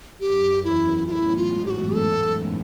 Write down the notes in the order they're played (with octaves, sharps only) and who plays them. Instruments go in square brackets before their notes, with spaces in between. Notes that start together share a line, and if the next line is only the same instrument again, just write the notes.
[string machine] F#2 [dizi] G4
[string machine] E2 [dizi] E4
[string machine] A2 [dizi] F4
[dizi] E4
F4
[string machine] G#2
[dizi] G4
F#4
A4